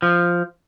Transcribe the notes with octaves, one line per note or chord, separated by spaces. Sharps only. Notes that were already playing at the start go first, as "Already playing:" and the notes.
F3